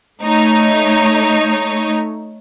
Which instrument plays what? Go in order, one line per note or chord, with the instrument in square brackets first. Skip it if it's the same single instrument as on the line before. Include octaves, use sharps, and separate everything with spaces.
[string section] A3 D#4 C#5